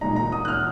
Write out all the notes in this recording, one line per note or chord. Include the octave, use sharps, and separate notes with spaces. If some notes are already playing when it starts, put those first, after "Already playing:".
A#2 G#3 D#4 A#5
A#5
D#6
F#6
F6